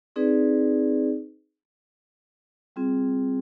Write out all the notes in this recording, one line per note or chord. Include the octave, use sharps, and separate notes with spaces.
C4 D#4 G#4 B4 D5
G3 C4 F4 G#4